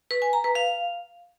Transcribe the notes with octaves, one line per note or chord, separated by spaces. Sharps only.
B4
G#5
A#5
B4
F5